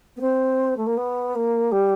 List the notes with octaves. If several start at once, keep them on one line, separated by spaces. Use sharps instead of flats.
B3
C4
A3
A#3
B3
A#3
G3